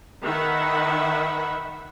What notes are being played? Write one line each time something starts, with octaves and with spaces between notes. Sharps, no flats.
D#3 B4 E5 F#5